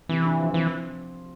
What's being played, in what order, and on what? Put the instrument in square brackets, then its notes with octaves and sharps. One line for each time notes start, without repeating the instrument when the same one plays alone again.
[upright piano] C3 [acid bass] E3
[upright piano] D4
F3
[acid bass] E3 [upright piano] C4